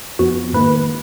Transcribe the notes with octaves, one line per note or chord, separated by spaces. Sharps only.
F2 F3 B3 F#4
G#2 D#3 A#3 B4